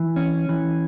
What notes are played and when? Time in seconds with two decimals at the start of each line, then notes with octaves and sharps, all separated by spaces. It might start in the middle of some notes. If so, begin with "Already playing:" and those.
Already playing: E3
0.16 C#4
0.49 E3